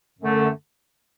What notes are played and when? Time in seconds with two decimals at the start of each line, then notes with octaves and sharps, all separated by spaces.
0.19 F#2 D3 A3